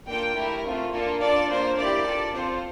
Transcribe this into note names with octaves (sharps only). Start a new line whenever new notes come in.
A#3 D4 F4 A4 G5
A3 E4 G4 A#4
A3 C4 F4
A#3 D4 F4 A4
D4 F4 A4 D5
A#3 D4 F4 C5
A#3 E4 G4 D5
D4 F4 A4
C4 F4 A4 C5